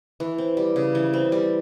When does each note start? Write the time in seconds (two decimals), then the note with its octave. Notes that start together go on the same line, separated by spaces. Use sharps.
0.20 E3
0.38 C4
0.57 G3
0.76 C#3
0.95 E3
1.13 C4
1.32 G3